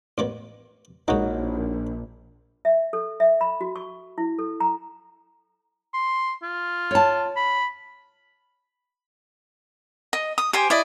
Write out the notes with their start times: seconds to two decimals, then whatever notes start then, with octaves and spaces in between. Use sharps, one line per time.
0.18 A1 A#3 B3
1.08 A#1 G#3 A#3 D#4 F#4 C#5
2.65 E5
2.93 A4
3.20 E5
3.41 B5
3.61 F#4
3.76 C#6
4.18 E4
4.39 A4
4.60 A#5
5.94 C6
6.43 F4
6.91 C#5 A5
7.36 B5
10.13 D#5
10.38 D#6
10.53 G4 C5 G#5
10.70 E4 D5 D#5